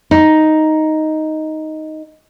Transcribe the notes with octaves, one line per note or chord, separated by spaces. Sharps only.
D#4